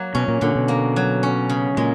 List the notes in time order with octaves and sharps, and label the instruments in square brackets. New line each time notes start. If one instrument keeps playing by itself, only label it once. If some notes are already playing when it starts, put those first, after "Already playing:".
Already playing: [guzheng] F#3 A#3
[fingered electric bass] B2 [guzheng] C#4
[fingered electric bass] A#2
[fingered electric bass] A#2 [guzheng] D3
[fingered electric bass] B2
[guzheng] A#3
F#3
C#4
C#3
[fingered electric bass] A#2 [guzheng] G#3